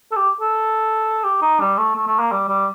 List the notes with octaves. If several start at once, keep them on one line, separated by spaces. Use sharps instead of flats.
A4
G4
A4
G4
D#4
G3
A3
A3
A3
A#3
G3
G3